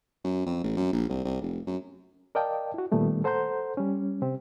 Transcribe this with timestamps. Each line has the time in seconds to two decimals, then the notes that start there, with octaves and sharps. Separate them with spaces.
0.24 F#2
0.46 F2
0.64 A1
0.77 F#2
0.92 A#1
1.09 C2
1.25 C2
1.41 F1
1.66 F#2
2.35 A#4 D5 D#5 F5 G5 A5
2.74 E4 F#4
2.92 A#2 D#3 G3 A3 B3
3.24 A4 C5 F#5 A#5 C6 G6
3.77 G3 C#4
4.22 C3 C4 G4